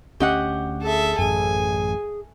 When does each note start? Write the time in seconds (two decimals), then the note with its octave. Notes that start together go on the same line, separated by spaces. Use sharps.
0.20 D2 C#4 G4 D#5 F#5
0.82 G#4 A4 E5
1.19 A1 F#2 G#4 G#5